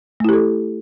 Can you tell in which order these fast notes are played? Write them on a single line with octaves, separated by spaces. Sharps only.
A3 E4 G4 A4